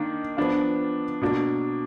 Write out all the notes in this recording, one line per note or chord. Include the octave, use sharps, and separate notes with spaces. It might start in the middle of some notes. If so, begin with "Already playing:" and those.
Already playing: D#3 A#3 D4
F3 B3 D4 F4
B2 A#3 D4